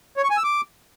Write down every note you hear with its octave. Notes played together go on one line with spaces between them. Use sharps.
C#5
C#6
G#5
E6
D6